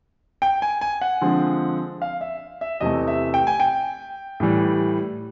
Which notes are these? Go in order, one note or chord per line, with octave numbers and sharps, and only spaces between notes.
G5
G#5
G#5
F#5
D3 F3 G#3 C4
F5
E5
E5
E2 C3 E3 A3 D#5
E5
G5
G#5
G5
A2 E3 G3